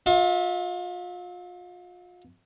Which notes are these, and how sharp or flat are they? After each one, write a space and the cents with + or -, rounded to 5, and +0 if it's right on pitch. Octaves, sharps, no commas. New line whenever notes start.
F4 +35 E5 -25